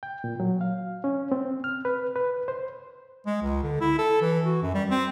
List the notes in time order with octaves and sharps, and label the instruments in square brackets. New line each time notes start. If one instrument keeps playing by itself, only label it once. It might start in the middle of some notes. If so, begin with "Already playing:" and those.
[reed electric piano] G5
A#2
F#3
F5
C#4
C4
F6
B4
B4
C5
[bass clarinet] G#3
C#2
D3
E4
A4
E3
F#4
F#2
G3
C4